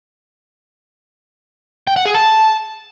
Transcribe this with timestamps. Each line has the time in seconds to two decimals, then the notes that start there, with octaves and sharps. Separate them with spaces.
1.87 G5
1.96 F#5
2.06 G#4
2.15 A5